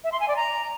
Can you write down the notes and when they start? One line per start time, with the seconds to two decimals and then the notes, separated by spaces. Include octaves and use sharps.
0.04 E5
0.12 C6
0.20 G#5
0.28 D5
0.36 A#5